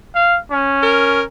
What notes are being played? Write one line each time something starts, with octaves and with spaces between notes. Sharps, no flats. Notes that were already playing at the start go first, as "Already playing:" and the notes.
F5
C#4
A#4